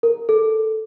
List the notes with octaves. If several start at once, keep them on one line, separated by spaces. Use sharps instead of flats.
A#4
A4